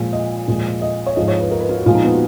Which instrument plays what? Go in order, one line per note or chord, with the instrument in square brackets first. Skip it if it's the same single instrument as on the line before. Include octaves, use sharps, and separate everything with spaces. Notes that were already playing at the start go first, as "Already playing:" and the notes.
Already playing: [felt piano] A#2 F3 G#3
D#5
A#2 F3 G#3
D#5
C#5
G#2 F3 G#3 D#5
C#5
B4
A#4
B4
F4
F#4
A#2 F3 G#3 F4
D#4
B3
F#4